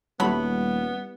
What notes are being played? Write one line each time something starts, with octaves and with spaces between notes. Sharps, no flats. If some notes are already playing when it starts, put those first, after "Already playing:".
D#1 F#3 G3 A3 B3 E4 G4 B5